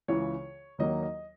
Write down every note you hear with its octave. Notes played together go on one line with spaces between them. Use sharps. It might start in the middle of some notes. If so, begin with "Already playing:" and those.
C#2 C#3 E3 C#5
D#2 D#3 F#3 A#3 D#5
D#5